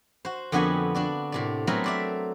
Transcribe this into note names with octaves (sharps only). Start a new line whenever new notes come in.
F#4 C5
F2 D3 B3 F#4 G4 G#5
D4 F#4 D5
A2 C3 D5
F#3 A3 B3 C4 F#4 A#4
C5 D5 E5